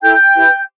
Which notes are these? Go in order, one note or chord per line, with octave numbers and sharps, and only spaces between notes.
E4 A4 G5 G6
E4 G4 B4